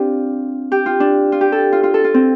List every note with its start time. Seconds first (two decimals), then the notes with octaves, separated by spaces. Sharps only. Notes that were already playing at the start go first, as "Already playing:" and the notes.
Already playing: C4 D4 F4 G4
0.72 G4
0.86 F4
1.00 D4
1.32 F4
1.41 G4
1.52 A4
1.72 F4
1.83 F4
1.94 A4
2.04 F4
2.14 C4